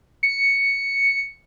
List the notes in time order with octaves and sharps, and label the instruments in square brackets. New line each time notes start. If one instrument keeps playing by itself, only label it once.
[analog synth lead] C#7